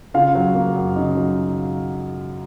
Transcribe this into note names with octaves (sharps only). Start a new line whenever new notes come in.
C#3 F4 F5
F#3
A#3
F#2
C#3 D#4 D#5
F#3